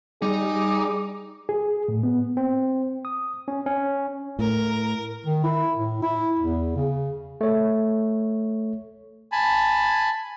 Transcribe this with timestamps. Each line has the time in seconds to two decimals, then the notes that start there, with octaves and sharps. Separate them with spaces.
0.22 G3 D#4 G#4 D6
1.49 G#4
1.88 A2
2.03 B3
2.37 C4
3.05 D#6
3.48 C#4
3.66 C#4
4.39 A2 A#4
5.26 D#3
5.44 E4
5.77 A2
6.02 E4
6.39 E2
6.76 C#3
7.41 A3 C#5
9.32 G#5 A5 B5